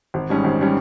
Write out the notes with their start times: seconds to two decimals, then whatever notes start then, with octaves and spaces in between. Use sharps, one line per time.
0.14 G#1
0.30 G#2 G3 C#4
0.44 G#1
0.61 G3 C#4